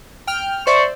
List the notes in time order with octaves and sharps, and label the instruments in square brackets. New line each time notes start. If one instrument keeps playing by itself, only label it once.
[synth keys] G5 F6
[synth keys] C5 D5 E5 [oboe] C#6